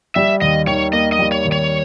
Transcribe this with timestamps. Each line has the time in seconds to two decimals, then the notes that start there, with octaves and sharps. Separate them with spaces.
0.15 G3 E5
0.41 D#2 D#5
0.67 D#3 C#5
0.93 A#3 D#5
1.12 D#5
1.19 G3
1.32 C#5
1.45 D#2
1.52 C#5